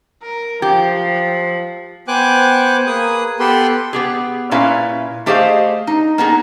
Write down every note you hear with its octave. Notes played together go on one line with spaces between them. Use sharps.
A#4
F3 G4
B3 C5 G5 G#5 D6 F#6
A#3 G#4 B4 D#6
B3 G4 A4 B4 C6
B3 G4 G#4
A#2 C#4 E4 B4 E5 F5
A3 G4 G#4 C5 D#5 F5
D#4
A#3 B3 D#4 G#4